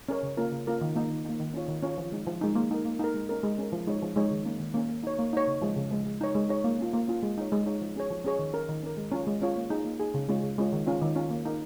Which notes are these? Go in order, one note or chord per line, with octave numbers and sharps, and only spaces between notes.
C#4 A#4 C#5
C#3
A#3 C#4 F4 A#4
C#3
A#3 C#4 F4 A#4
D#3
A#3 D#4
D#3
A#3 D#4
D#3
C#4 F4 C#5
D#3
C#4 F4 C#5
F3
G#3 D#4
F3
G#3 D#4
A#3
D#4 A#4
A#3
D#4 A#4
G#3
C#4 A#4
G#3
C#4 A#4
F3
G#3 D#4 C#5
F3
G#3 D#4 C#5
D#3
A#3 C#4
D#3
A#3 C#4
A#3
D#4 C#5
A#3
D#4 C#5
C#3
F3 G#3
C#3
F3 G#3
G#3
D#4 C#5
G#3
D#4 C#5
A#3
C#4 F4
A#3
C#4 F4
G#3
D#4 C#5
G#3
D#4 C#5
F3
C#4 G#4 C#5
F3
C#4 G#4 C#5
D#3
C#4 A#4
D#3
C#4 A#4
G#3
C#4 F4 C#5
G#3
C#4 F4 C#5
A#3
D#4 G#4
A#3
D#4 G#4
C#3
G#3 C#4 F4 C#5
C#3
G#3 C#4 F4 C#5
D#3
C#4 F4
D#3
C#4 F4
A#3
D#4 A#4